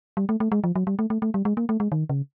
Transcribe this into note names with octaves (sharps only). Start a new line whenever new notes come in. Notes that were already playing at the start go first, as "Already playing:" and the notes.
G3
A3
A3
G#3
F3
F#3
G3
A3
A3
A3
G3
G#3
A#3
A3
G#3
D#3
C#3